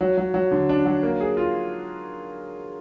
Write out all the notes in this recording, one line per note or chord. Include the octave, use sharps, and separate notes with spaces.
F#3
F#3
F#3
D3
D4
F#3
A#3
G#4
F4